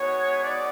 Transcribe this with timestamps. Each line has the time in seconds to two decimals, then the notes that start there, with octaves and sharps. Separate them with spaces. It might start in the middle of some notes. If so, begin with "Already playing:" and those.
Already playing: G#3 B3 D#4 F#4 C#5
0.42 D5